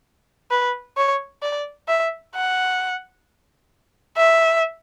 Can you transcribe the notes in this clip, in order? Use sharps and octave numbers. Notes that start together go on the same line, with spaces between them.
B4
C#5
D5
E5
F#5
E5